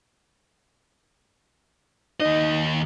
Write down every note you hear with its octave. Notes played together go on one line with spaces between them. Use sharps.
D#2 D#4 D#5